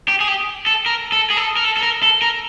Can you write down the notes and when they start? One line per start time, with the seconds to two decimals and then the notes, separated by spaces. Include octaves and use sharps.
0.08 G4
0.20 G#4
0.28 G4
0.66 A4
0.86 A#4
1.12 A4
1.30 G#4
1.37 A4
1.56 A#4
1.64 A4
1.77 A4
1.83 A#4
2.03 A4
2.22 A#4